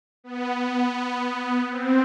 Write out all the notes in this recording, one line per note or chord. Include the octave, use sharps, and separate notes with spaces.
B3
C4